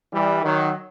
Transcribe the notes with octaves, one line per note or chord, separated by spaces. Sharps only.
E3 G3
D#3 F#3